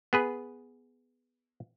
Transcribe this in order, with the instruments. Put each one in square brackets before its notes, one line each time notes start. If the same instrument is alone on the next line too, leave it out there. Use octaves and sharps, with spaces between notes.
[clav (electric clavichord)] B3 G#4 B4